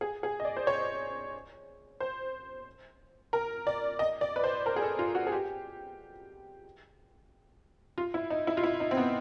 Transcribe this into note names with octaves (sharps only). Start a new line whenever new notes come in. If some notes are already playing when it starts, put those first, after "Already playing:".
G#4
G#4
D#5
D5
C5
C#5
C5
A#4
D5
D#5
D5
B4
C5
A#4
G#4
A4
F4
F#4
G#4
G4
F4
E4
D#4
E4
F4
E4
D#4
C4
B3